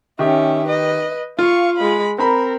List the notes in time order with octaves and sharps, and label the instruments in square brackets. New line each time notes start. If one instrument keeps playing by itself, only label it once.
[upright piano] D#3 G4 [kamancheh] C#4 E5
[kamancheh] B4 D#5
[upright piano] F4 [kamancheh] F5 C#6
[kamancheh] G#3 B5
[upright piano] C4 A#5 B5 [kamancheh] A#4